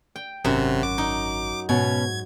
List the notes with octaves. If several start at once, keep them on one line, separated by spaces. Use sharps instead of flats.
G5
G#1 F#2 C3 F#4
D6
D#4
G#2 B2 C#4 F#4 G#6